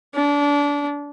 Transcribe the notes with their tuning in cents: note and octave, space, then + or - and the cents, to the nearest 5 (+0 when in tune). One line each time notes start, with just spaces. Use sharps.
D4 -25